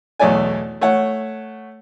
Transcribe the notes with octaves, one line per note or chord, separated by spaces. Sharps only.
B1 E2 A3 C#5 D5 G#5
A3 C#5 F#5